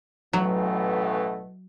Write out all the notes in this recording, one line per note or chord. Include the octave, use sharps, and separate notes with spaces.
A1 B2 F#3 A3